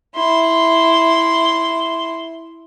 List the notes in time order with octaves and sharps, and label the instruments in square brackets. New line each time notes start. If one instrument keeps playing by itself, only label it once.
[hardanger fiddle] E4 C6